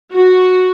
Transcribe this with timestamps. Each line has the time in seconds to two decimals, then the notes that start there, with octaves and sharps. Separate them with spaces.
0.14 F#4